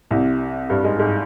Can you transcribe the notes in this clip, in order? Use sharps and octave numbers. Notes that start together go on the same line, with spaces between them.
C2 C3
G2 G3
G#2 G#3
G#2 G#3